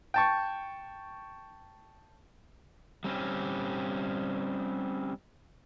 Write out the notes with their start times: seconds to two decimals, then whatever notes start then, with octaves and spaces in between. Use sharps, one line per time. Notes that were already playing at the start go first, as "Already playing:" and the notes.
0.14 G5 A5 C#6
3.04 G3 C4 C#4